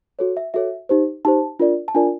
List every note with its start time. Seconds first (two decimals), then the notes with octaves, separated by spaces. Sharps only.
0.19 F#4 A4 C#5
0.37 E5
0.54 F#4 A4 C#5 E5
0.89 D#4 G4 C5
1.25 D#4 G4 C5 A5
1.59 D4 F4 A#4 D5
1.88 A5
1.94 D4 F4 A#4 D5 G#5